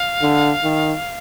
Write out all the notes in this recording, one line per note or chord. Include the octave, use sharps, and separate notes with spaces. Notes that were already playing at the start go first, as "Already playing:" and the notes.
Already playing: F5
D3
D#3